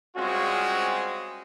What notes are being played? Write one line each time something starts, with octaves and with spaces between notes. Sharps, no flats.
G3 G#3 C4 C#4 F4 F#4